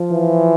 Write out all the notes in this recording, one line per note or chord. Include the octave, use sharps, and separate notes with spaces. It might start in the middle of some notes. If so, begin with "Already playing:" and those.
Already playing: F3
E3